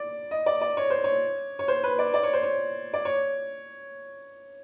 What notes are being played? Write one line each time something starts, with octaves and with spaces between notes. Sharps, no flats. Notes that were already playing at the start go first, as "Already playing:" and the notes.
Already playing: D5
D#5
D5
D5
C#5
C5
C#5
C#5
C5
B4
D5
D5
C#5
C5
C#5
D5
C#5